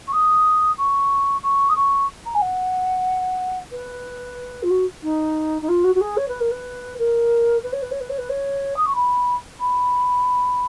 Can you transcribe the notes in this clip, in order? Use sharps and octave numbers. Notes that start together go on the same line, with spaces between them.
C#6
D#6
C#6
C#6
D#6
C#6
A#5
G#5
F#5
B4
F4
F#4
D#4
D#4
F4
F#4
F#4
G#4
C#5
B4
A#4
B4
A#4
B4
C#5
B4
C#5
B4
C#5
B4
C#5
D#6
C#6
B5
B5